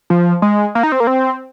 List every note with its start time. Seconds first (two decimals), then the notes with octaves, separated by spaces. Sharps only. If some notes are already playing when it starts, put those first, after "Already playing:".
0.10 F3
0.42 G#3
0.75 A#3
0.83 D#4
0.92 C4
1.00 A#3
1.07 C4